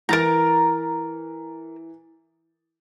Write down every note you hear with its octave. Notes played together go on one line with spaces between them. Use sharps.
E3 A#4 A#5 A6 D7